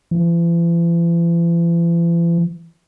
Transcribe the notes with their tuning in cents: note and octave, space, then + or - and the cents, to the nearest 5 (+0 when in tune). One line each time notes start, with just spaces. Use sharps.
E3 +45